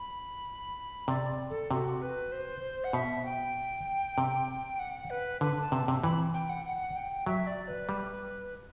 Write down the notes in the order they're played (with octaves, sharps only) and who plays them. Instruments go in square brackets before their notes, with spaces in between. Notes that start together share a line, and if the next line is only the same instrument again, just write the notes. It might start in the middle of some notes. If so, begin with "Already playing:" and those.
Already playing: [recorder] B5
[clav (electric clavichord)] C3 [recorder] D5
[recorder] A4
[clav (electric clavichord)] C3 [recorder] F#4
[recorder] B4
C5
F#5
[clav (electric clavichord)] B2 [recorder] E5
[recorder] G5
[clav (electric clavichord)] C3
[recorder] F#5
B4
[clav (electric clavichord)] D3 [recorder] B4
[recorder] A5
[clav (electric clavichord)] C3
C3
[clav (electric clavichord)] E3 [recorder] B5
[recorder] G5
F#5
F#5
G5
[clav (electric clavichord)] F#3 [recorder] E5
[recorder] D5
B4
[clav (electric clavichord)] G3